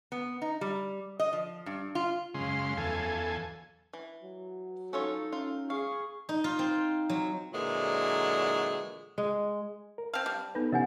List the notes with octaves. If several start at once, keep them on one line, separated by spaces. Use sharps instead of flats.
B3
D#4
G3
D#5
F3
G2
F4
F#2 C#3 G#3 F5 C6
E2 A4 G#5
E3
F#3
C#4 D#4 F4 A4 C#5
C#4 F4
G#4 F5 C#6
D#4
F4
C4
F#3
A#2 D3 E3 F#3 G#3
G#3
A#4
C4 F5 A5
G3 D6
B3 D#4 A4 B4
C3 E3 B3 C#4 G4 D#5 F#5 G#5